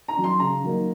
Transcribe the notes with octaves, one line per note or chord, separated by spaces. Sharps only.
A#5
F#3 C#4
C6
C#3 A#5
F#3 A#3 D#4